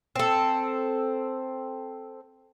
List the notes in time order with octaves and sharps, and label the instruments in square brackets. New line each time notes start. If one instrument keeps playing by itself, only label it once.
[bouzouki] C4 A4